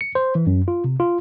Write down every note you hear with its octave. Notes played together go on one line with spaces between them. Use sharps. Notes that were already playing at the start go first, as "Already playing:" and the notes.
C#7
C5
E3
F#2
F4
C3
F4